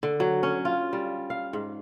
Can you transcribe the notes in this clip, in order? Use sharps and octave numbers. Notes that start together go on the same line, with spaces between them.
D3
F#3
C#4
F4
G3
F5
G#2